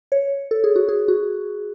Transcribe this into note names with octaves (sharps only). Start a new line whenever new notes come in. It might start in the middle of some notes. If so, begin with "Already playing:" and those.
C#5
A4
G#4
F#4
G#4
F#4